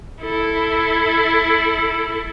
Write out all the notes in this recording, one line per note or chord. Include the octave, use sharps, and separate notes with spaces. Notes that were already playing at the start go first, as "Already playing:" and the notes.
E4 A4